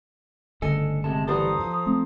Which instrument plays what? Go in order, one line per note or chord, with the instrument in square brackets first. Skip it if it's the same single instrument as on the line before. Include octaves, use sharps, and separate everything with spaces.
[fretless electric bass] G1 D2 C#3 [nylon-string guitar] D4 D#5 G#5 [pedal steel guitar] A4
[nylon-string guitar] C3 [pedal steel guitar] G#3 A5
[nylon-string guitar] E3 G3 B3 [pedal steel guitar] A4 C5 A#5 [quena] D#6
[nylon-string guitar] F3
[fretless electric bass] A3 C4